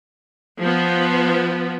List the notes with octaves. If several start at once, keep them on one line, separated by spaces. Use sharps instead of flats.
F3 B3